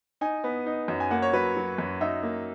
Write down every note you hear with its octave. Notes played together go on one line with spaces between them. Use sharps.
D#4 G#5
B3
D#4
F#2
G#5
A#3 F#5
C#5
F#3 B4
F#3
F#2
D#4 E5
A#3